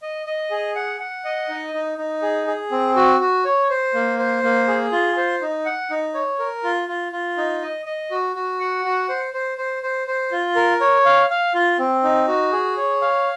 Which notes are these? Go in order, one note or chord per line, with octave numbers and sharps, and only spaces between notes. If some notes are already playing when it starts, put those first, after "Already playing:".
D#5
D#5
G#4
F#5
F#5
D#5
D#4
D#4
D#4
G#4
G#4
C4
F#4
F#4
C#5
C5
A#3
C5
A#3
G#4
F4
C5
D#4
F#5
D#4
C#5
A#4
F4
F4
F4
D#4
D#5
D#5
F#4
F#4
F#5
F#4
C5
C5
C5
C5
C5
F4
A#4
C#5
F5
F5
F4
C4
D#4
F#4
G#4
C#5
F5